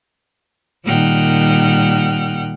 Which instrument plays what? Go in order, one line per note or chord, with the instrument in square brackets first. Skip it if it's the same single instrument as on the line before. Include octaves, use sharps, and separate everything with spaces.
[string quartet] A#2 D#3 G3 F#5 G5 F6